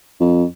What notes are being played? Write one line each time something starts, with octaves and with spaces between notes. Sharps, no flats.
F2